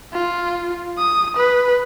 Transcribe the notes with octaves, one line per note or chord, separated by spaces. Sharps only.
F4
D#6
B4